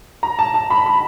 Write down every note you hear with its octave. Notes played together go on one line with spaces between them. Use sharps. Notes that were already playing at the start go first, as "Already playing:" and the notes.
A#5
A5
A5
B5
B5